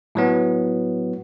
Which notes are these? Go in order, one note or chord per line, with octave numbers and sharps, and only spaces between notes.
A2 F#3 B3